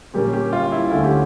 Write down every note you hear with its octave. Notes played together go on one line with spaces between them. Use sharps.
A#2 G3 A#3 C#4 G4
G4
F4
E4
D2 D3 A3 C#4 F4
G4